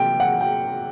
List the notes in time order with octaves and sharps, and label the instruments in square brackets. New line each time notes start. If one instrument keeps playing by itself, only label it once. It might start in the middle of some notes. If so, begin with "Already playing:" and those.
Already playing: [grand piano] C3 F#3 A#3 [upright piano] G5
[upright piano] F#5
G5